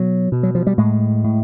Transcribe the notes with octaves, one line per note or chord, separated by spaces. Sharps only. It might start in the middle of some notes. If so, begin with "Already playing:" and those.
Already playing: B2 F#3
B2
F#3
F3
G3
A2 G#3
A2